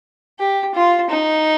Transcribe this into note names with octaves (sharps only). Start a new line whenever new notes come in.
G4
F4
D#4